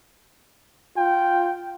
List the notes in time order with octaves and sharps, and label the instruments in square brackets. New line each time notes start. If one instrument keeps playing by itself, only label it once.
[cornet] F4 [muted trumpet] G5